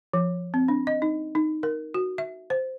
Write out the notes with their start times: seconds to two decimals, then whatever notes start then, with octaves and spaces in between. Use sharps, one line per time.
0.14 F3
0.54 C4
0.68 D4
0.87 D#5
1.02 D#4
1.35 D#4
1.63 A#4
1.94 F#4
2.18 E5
2.50 C5